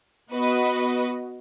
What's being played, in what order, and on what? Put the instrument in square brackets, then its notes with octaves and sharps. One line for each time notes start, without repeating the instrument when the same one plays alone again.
[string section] B3 F#4 B4 D#5